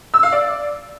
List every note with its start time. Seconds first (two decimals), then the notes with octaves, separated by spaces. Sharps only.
0.14 E6
0.23 F5
0.32 D5